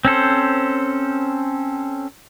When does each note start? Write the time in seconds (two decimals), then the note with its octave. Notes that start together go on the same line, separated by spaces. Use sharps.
0.05 C4 C#4 A4 C5